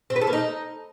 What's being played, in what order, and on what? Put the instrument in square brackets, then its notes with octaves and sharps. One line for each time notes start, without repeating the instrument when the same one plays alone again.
[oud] C4
B4
A4
A#3
D#4